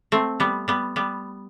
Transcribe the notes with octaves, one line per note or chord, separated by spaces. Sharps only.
A3 C4
G3 B3
G3 B3
G3 B3